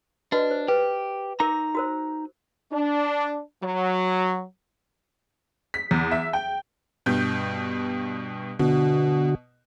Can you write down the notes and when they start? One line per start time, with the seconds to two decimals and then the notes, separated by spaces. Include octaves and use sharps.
0.32 D4 F#4 B4 D#5
0.51 C5
0.68 G4 B4
1.40 D#4 A#4 A#5 D6
1.75 F#4 A#4 C5
2.73 D4
3.64 F#3
5.74 B6
5.91 E2
6.11 E5
6.33 G5
7.06 G2 B2 G6
8.59 B2 D3 F#4